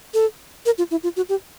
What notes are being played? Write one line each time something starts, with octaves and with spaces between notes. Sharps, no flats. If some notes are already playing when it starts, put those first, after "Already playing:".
A4
A#4
F4
E4
F4
F#4
G4